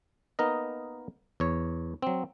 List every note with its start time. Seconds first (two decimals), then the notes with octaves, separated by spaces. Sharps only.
0.39 A#3 B3 D#4 A#4 D#5
1.40 E2 C#5
2.02 F#3 C4